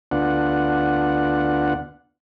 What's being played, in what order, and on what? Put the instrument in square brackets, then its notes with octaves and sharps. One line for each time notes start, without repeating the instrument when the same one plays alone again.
[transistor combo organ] D2 B3 D4 F4 F#5